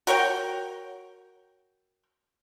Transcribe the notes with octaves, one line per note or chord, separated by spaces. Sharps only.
F#4 A#4 C#5 G5